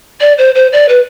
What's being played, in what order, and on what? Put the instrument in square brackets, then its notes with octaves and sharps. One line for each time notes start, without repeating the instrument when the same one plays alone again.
[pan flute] D5
C5
C5
D5
B4